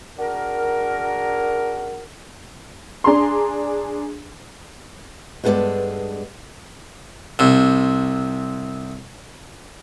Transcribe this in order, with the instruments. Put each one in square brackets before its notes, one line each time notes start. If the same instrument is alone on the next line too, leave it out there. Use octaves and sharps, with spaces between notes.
[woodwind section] D4 F#4 G#4 A#4
[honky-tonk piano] D4 G#4 A#5 C6
[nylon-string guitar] G2 G#3 B3 D#4 A4 D5
[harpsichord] C2 C3